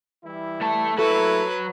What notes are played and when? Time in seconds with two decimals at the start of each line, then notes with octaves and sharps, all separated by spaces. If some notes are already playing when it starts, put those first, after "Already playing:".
0.24 E3 G3 E4
0.61 A3 A5
0.98 F#3 A3 A#3 E4 F#4 A4 B4